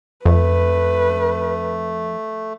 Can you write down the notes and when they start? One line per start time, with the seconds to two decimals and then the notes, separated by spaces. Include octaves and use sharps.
0.25 F2 A3 B4